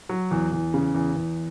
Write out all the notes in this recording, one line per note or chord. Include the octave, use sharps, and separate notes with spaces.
F#3
E2
E2
C#3
E2
E2